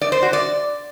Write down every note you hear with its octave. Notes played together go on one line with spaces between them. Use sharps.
D5
C5
F#4
D5